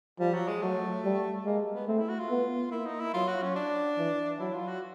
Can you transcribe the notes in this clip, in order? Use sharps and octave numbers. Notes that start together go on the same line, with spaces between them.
F3 G3
F#3
G#3
F#3 A3
G3
G#3 A#3
B3
A3 C4
E4
F#4
F4
B3
A#3 E4
D#4
E4
F#3 F4
F#4
C#4
D4
E3
F#3 E4
F4
F#4